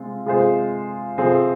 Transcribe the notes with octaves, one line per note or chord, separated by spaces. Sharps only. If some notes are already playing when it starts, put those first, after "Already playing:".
Already playing: C3 G#3 C4 F4
C3 G#3 F4 G#4 C5
C3 F3 C4 G#4